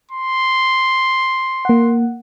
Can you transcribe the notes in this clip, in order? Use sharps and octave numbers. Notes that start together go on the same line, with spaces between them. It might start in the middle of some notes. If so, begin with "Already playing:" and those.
C6
A#3 F#5